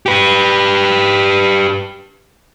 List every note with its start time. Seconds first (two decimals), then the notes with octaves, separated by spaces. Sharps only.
0.06 G4 B4